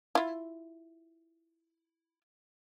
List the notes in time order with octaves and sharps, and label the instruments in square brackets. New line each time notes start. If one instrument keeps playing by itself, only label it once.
[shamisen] E4 F4